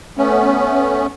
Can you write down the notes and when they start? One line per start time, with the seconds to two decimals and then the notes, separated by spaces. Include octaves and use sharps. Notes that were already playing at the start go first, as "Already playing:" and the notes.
0.17 A3 B3 C#4